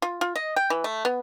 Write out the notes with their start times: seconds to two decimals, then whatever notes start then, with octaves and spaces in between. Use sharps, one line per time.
0.02 F4
0.21 F4
0.36 D#5
0.56 G5
0.70 E3
0.84 A3
1.05 B3